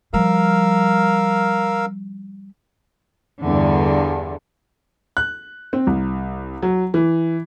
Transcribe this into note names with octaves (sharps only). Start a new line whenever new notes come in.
F3 G3 A#4 F5 E6
E2 G2 D3
F#6
C4
C2
F#3
E3